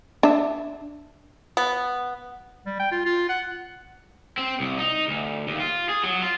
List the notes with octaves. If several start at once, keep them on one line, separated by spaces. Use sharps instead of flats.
D4 E5
B3
G3
G5
F4
F4
F#5
C4
C2
D#4
D2
D#2
F4
G#4
F#3
F4